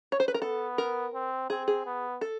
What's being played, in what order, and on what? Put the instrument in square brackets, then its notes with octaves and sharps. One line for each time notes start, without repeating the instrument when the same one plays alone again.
[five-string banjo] C#5
C5
B4
A#4
[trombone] B3 [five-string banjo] A4
[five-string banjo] A#4
[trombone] C4
[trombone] C4 [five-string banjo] G#4
[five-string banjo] G#4
[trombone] B3
[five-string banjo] A4